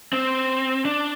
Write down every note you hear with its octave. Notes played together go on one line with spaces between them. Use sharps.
C4
D4